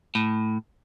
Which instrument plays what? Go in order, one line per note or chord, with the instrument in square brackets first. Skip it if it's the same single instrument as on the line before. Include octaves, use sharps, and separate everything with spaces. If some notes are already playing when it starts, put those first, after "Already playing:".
[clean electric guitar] A2